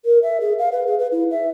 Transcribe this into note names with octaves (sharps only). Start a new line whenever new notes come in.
A#4
E5
G#4
F5
B4
G#4
B4
E4
E5